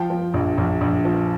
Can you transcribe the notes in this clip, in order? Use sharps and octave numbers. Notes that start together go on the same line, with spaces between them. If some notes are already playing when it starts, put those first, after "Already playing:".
Already playing: F3 G5
F3
A#1
A#1
A#1
F3